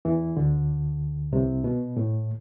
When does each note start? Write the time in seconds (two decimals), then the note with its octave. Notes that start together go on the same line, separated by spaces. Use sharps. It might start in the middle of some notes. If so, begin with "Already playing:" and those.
0.05 E2 E3
0.37 D2 D3
1.32 C2 C3
1.64 B2
1.97 A2